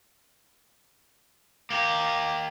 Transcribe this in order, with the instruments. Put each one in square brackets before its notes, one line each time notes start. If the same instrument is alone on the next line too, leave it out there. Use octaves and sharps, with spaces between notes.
[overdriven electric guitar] A#3 G4